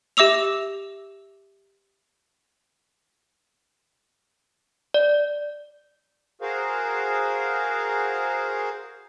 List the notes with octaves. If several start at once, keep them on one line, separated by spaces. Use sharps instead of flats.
G4 E5 D6 E6 F7
D5
F#4 G#4 A#4 C5 F5